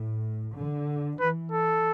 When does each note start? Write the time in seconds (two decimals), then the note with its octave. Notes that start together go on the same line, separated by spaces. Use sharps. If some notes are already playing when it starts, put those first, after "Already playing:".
Already playing: A2
0.56 D3
1.20 E3 B4
1.52 A4